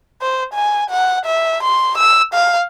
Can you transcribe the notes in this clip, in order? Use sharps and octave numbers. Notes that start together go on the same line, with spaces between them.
C5
G#5
F#5
E5
C6
E6
F5